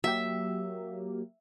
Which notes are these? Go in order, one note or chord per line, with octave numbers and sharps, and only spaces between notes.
F#3 A#3 G4 E5